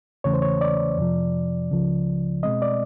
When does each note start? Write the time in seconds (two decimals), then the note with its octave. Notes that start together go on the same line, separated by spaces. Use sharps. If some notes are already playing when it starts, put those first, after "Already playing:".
0.24 E2 C#3 E3 A3 C#4 C#5
0.34 C5
0.42 C#5
0.61 D5
0.97 F2 C3 F3
1.71 C#2 C#3 F3
2.43 B2 G#3 C4 D#5
2.62 D5